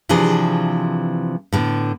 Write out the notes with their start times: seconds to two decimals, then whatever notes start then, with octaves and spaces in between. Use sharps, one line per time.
0.09 C3 E3 F3 D4 G#4
1.53 A2 D3 B3